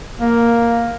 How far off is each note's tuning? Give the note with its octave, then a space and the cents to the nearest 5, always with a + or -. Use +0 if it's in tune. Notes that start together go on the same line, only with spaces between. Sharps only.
A#3 +5